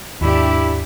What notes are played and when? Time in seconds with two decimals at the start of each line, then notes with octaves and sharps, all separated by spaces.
0.21 D#2 G#2 D4 E4 G4 E5